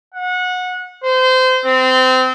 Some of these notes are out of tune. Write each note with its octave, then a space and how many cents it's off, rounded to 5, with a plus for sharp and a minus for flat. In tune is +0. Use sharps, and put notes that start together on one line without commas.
F#5 -25
C5 -25
C4 -25